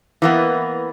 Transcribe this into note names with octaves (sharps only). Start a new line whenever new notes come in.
E3 A#3 B3